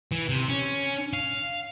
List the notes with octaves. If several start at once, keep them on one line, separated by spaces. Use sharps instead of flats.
E3
C3
C#4
F5